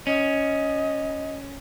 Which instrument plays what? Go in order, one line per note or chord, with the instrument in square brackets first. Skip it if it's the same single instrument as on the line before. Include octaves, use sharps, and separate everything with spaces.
[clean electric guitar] C#4 [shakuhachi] D#5